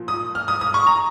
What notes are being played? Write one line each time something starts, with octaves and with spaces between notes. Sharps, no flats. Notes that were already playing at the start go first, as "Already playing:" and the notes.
Already playing: A#2 F3
D#6
F6
D#6
D#6
C#6
A#5